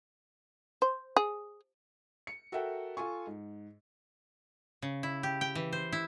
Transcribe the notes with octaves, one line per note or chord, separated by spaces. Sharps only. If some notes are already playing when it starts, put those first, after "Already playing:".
C5
G#4
C#7
F#4 A4 A#4 E5 F#5 G5
F4 A4 G#5 C#6
G#2
C#3
E4
G4
G5
E3
C5
E4